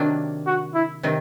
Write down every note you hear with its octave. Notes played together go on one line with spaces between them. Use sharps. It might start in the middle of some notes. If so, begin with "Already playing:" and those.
Already playing: C3 D#3 F#3 A#3 D4
F#4
E4
C3 D#3 F#3